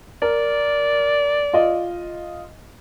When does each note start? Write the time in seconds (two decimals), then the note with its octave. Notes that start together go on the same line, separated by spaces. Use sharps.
0.22 A#4 D5
1.53 F4 D#5